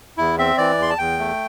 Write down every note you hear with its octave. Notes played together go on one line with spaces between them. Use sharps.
E2 E4
C4 E5
E3 D5
E2 C6
A5
E2 G5
A3